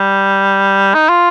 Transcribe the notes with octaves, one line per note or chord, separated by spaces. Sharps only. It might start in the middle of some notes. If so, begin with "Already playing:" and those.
Already playing: G3
D#4
F4